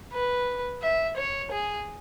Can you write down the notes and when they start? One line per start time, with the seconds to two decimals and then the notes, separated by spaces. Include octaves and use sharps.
0.13 B4
0.82 E5
1.17 C#5
1.52 G#4